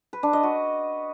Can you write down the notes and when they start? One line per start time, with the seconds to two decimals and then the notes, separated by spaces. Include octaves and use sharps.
0.13 B4
0.23 D4
0.33 D#5
0.43 F#4